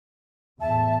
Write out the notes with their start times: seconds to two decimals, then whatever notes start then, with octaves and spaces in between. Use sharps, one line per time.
0.61 E2 A2 E5 A5